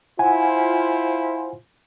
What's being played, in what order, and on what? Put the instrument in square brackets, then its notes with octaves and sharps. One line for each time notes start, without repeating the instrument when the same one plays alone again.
[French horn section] E4 F4 C5 [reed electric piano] F#5 G#5